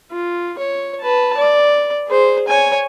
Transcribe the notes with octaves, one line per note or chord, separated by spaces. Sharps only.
F4
C#5
B4 A5
D5
G#4 C5
C#5 G#5